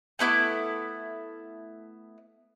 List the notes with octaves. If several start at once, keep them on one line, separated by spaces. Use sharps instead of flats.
A3 B3 E4 D6